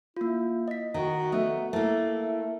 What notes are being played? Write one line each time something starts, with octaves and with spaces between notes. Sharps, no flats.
A#3 E4 F4
D#5 B6
D#3 F#4
A3 B3
A3 A#3 E4 A#4